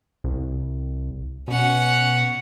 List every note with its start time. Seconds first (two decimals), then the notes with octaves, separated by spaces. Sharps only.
0.24 C2
1.48 B2 C#4 F#5